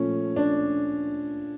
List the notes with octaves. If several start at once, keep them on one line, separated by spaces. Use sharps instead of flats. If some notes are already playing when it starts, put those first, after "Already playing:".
Already playing: A#2 F3 A3 C#4
D4